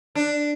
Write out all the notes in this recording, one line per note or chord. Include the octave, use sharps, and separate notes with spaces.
D4